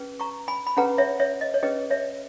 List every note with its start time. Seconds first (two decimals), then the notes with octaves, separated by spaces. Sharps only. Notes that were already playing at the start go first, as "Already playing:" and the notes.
Already playing: C#4 G#4 B4
0.20 A#5 C#6
0.48 G#5 B5
0.67 B5
0.77 C#4 G#4 B4 F#5 A#5
0.98 C#5 E5
1.20 C#5 E5
1.41 D#5
1.54 C#5
1.63 C#4 G#4 B4 D#5
1.91 C#5 E5